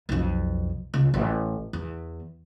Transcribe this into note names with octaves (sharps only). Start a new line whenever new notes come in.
B1 F2
C#2
A1
E2